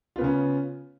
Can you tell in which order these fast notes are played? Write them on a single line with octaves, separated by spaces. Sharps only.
F4 B3 C#3 C#4